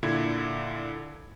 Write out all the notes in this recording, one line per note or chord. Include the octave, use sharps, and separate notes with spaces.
A#2 D3 E4 G#6